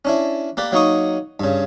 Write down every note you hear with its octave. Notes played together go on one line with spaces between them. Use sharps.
C#4 D4 E4
A#3 G4 B4 D5
F#3 A#3 D#4 C#6 D#6
G2 C#3